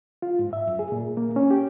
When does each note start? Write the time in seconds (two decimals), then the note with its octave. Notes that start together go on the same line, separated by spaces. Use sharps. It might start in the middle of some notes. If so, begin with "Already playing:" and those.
0.22 F4
0.39 G#2
0.53 E5
0.67 F#2
0.79 G#4
0.92 A#2
1.17 A#3
1.36 C#4
1.51 G4